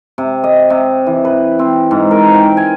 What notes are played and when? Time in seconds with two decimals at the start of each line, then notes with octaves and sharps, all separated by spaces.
0.18 C3
0.44 D#5
0.70 C3
1.06 E3
1.25 B4
1.59 C4
1.91 G#2
2.11 A#4
2.34 G5
2.57 G#5